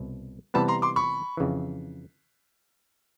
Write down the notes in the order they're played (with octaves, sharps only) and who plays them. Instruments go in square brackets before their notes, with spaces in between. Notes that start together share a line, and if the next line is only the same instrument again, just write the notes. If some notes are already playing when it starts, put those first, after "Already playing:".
Already playing: [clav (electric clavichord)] C2 B2
[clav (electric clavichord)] C3 E3 G3 B3 [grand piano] A5 B5
[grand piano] A#5 C6
C6 D6
B5 C#6
[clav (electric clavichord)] F2 C#3 E3